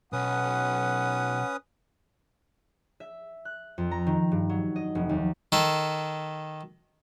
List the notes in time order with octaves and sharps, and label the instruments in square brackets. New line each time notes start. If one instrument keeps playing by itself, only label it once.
[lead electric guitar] B1 [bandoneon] C#4 B4 D#6 [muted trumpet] F#5
[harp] E5
F#6
F2
A#5
D#3
G2
F#3
D#5
F1
D#2
[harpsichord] D#3 A4